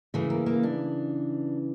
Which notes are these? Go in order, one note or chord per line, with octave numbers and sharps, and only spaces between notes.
C#3 E3 A3
A#3
A#3
D4